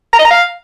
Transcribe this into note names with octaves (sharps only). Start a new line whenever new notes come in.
A#5
D#5
A#5
F5